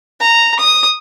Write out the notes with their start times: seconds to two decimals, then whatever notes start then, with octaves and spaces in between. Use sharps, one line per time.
0.21 A#5
0.59 D#6